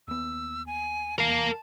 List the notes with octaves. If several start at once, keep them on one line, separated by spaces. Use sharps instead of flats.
D#2 B3 E6
G#5
F1 E2 A#4 F5 A5